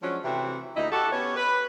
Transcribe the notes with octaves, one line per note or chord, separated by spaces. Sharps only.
F3 F#3 G#3 C#4 D4 F#4
C3 E3 A3 C4 F#4 E5
D2 A#2 D#4 E4 D#5
F#4 G4 A4
B3 C#4 G4 C#5
B4